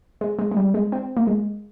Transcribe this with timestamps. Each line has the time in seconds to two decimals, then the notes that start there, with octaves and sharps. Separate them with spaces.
0.21 G#3
0.39 G#3
0.51 G#3
0.57 G3
0.74 G#3
0.92 C4
1.17 A#3
1.27 G#3